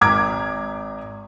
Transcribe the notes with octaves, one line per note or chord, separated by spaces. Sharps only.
G#1 A#5 D6 G#6